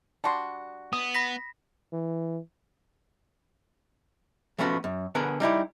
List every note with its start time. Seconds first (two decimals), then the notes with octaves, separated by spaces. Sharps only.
0.24 G3 D4 F#4 A5 C6
0.93 B3 D#6
1.14 B5 A#6 B6
1.93 E3
4.58 F3 A3 B3 C#4 F#4
4.84 F#2
5.15 D3 B3 G#4 A#4
5.40 G3 D#4 E4 G4